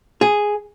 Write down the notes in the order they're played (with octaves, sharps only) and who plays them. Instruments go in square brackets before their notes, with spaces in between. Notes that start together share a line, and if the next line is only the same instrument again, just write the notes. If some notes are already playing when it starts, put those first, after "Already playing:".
[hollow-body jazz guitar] G#4